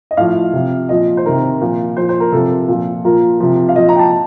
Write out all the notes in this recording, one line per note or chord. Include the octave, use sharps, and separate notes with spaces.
D#5
A2 F3 F5
C3 F3
A#2 F3 D#5
C5
C3 D#3 A#4
A#2 F3
A#2 F3 C5
C5
A#4
C3 F3 A4
A#2 F3
A#2 F3 A#4
C3 F3
F5
A#2 F3 D#5
A#5
G5
A5